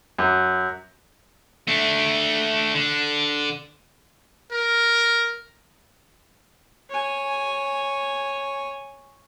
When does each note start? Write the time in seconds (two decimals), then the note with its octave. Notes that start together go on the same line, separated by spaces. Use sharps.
0.19 F#2
1.68 A3 D4
2.75 D3
4.53 A#4
6.90 C#5 G#5